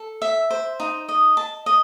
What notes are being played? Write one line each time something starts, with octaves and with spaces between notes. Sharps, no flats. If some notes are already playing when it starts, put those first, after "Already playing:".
Already playing: A4
E5
C5
D#4
D#5
A5
D#5